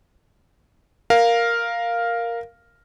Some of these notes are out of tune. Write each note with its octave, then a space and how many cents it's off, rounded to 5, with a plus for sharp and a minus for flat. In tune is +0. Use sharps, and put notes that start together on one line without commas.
A#4 +0 F5 +0